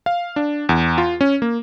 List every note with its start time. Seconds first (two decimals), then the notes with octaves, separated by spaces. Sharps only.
0.06 F5
0.36 D4
0.69 E2
0.98 F4
1.21 C#4
1.42 A#3